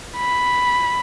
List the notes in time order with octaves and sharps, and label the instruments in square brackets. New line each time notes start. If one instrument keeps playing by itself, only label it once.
[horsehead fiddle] B5